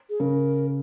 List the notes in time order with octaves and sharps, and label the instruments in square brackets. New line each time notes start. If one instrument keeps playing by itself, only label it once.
[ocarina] G#4
[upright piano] C#3 [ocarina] A#4